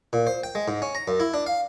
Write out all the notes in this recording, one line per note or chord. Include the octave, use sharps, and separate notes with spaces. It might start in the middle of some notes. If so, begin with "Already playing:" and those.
A#2
C5
G5
G#3
G#2
C#4
A#5
F#2
E4
D4
F5